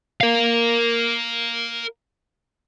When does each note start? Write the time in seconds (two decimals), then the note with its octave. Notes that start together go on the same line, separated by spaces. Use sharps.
0.21 A#4 F5